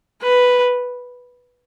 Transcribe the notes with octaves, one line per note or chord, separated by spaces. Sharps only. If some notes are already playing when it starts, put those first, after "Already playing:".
B4